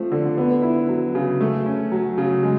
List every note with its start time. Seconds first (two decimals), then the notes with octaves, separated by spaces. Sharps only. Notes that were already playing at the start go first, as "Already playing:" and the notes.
Already playing: F3 A3 C4
0.12 D3
0.37 B3
0.62 E4
0.89 F#3
1.15 C#3
1.41 A3
1.66 C#4
1.92 F#3
2.18 C#3
2.43 G#3